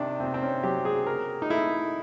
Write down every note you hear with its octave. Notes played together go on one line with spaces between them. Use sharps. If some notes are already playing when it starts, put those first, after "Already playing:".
Already playing: C3 D#3 D4
C3 C4
C4
C#4
F#3 G4
G#4
C#3 A#4
D#4
A3 E4